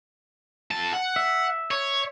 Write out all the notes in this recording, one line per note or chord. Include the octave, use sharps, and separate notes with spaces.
F2 A5
F#5
E5
C#5